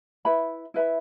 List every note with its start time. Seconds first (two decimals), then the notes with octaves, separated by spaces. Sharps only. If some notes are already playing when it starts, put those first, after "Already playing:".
0.25 E4 B4 E5 B5
0.74 E4 B4 E5 B5